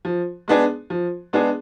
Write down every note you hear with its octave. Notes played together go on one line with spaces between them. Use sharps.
F3
G#3 B3 D4 G#4
F3
G#3 B3 D4 G#4